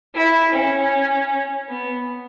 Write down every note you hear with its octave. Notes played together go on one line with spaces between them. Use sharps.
E4
C#4
B3